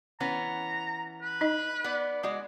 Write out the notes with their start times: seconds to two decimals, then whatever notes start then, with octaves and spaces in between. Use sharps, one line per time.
0.20 E3 B3 C#4 A#5
1.22 B4
1.41 D#4 D#5
1.84 B3 D5
2.23 G#3 F#4 D5